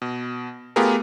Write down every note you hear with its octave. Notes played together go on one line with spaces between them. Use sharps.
B2
A3 B3 F4 G4 G#4 A#4